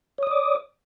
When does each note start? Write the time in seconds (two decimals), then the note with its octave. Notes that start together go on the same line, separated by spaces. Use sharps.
0.18 C#5
0.23 D#6
0.27 D5
0.31 D6